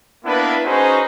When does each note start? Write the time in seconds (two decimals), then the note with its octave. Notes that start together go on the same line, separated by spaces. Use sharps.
0.25 A#3 B3 D4 E4 B4
0.65 C#4 D#4 F#4 G#4 B4 C5